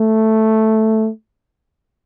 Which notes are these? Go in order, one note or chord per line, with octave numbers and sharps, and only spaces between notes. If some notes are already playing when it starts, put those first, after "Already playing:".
Already playing: A3